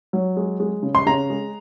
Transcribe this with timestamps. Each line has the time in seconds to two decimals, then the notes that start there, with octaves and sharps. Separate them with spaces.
0.13 F#3
0.37 G#3
0.60 G#3
0.83 C#3
0.95 C6
1.06 C#3 A#5
1.30 G#3